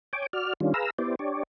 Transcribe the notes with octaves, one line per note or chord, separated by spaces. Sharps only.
C#5 G5 G#5 D6
F#4 D5 F6
D#3 G3 C#4 D4 F4
G#4 B4 F5 A#5 E6
B3 E4 G4 C5 D5
D4 G4 C#5 D5